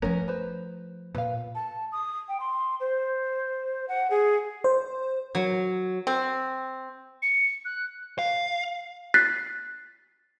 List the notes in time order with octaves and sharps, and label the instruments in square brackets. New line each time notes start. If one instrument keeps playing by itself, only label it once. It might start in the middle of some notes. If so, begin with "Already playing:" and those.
[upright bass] F3 A3 [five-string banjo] B3 C#4 A#4
[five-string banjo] B4 C5
[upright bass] A#2 [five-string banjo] B4 F5
[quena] A5
D#6
G5
C6
C5
F#5
G#4
[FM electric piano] C5
[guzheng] F#3
[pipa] C4
[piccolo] C#7
F#6
[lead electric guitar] F5
[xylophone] F#6 A6 B6 C7